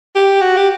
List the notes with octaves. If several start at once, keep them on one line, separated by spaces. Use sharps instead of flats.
G4
F#4
G4